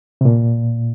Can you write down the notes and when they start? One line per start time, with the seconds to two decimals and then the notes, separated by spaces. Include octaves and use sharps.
0.21 C3
0.25 A#2